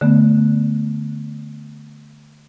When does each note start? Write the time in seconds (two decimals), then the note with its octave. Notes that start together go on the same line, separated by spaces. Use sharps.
0.01 D3 A3 B3